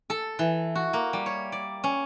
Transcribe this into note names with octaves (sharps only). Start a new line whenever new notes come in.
A4
E3
F#4
A#3
G3
C#5
D5
C#4